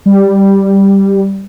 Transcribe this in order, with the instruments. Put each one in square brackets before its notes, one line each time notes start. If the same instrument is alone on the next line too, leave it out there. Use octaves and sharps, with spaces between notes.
[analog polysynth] G3